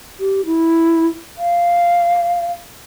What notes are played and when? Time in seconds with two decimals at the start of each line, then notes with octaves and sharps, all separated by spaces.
0.20 G4
0.46 E4
1.38 F5